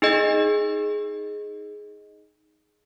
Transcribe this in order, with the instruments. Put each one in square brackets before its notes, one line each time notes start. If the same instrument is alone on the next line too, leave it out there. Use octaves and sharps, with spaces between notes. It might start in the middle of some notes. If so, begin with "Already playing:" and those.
[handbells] D#4 G#4 D#5